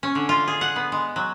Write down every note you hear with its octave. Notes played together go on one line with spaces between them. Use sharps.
C#4
D3
F4
G#4
F#5
B3
G#3
F#3